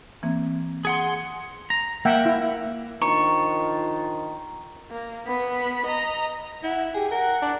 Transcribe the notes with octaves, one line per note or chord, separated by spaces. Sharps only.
E3 A#3 C4
G#4 F#5 C6
A#5
A#3 E5 F#5 G5
E4
D#3 F3 D4 F4 A#5 C#6
A#3
B3 B5
D#5 A#5
E4 F#5
G4 G#4
A#4 F#5
D4